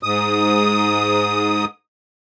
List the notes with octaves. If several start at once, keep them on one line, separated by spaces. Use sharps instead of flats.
G#2 D#6